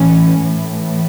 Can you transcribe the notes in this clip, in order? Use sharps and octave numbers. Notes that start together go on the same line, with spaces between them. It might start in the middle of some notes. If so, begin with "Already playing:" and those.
Already playing: A2 E3 C#4
A2 E3